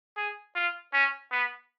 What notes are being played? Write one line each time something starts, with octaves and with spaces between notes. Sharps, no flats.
G#4
F4
C#4
B3